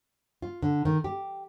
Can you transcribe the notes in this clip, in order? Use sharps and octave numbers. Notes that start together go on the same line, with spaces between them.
F4
D3
D#3
G4